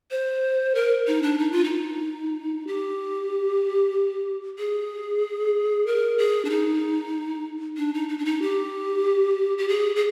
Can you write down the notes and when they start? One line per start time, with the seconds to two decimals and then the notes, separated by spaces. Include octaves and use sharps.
0.11 C5
0.75 A#4
1.07 D#4
1.23 D4
1.38 D#4
1.52 F4
1.64 D#4
2.67 G4
4.58 G#4
5.87 A#4
6.18 G#4
6.45 D4
6.50 D#4
7.77 D4
7.94 D#4
8.09 D#4
8.18 D4
8.25 D#4
8.42 G4
9.58 G4
9.69 G#4
9.96 G#4